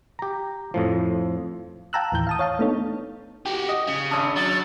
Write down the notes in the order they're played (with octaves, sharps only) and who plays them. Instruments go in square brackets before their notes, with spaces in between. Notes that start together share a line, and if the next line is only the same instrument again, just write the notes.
[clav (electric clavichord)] G4 A#5
F2 A2 F3
[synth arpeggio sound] F5 G5 A5 A#5 E6 F#6
D#2 A2 E3 G6
F5 A5 D#6
C#5 F5 A5
A3 B3 D4 D#4 A4 C#5
[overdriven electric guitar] F#4 G4
[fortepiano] D#5
[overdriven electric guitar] C#3
[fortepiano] G#1 D4 [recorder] D#6
[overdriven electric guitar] F#3 [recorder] A6